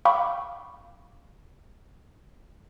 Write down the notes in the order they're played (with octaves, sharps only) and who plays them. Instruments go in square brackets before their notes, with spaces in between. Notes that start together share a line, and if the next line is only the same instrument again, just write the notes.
[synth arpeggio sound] F5 G5 B5 C#6 D6